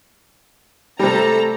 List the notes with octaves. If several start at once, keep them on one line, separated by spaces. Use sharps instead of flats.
C3 G3 A3 A4 A#5